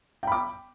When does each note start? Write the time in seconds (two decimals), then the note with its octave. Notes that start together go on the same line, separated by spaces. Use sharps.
0.23 G5
0.27 B5
0.32 D6